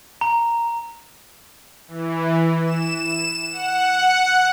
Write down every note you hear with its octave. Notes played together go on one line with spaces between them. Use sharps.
A#5
E3
E7
F#5